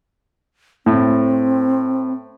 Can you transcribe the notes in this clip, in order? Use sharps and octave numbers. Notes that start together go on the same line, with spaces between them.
A2 C4